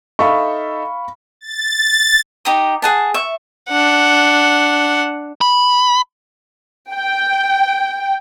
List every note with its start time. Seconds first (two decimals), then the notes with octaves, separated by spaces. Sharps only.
0.19 D#4 A4 E5 F5 B5 C#6
1.41 A6
2.45 D#4 G4 A#5 D#6
2.82 G#4 F#5 A5
3.14 E5 C#6
3.69 D4 F#5
5.41 B5
6.92 G5